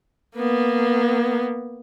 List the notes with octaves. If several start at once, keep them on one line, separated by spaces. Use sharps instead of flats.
A#3 B3